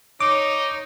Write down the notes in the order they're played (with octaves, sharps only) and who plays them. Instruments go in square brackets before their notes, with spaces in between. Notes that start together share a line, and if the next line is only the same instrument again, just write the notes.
[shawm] D#4 [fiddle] C#5 [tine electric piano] D6